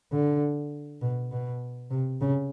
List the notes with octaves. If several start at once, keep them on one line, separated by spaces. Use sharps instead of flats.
D3
B2
B2
C3
C#3